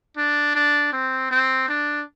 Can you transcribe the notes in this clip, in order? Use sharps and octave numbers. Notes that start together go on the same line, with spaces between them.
D4
D4
C4
C4
D4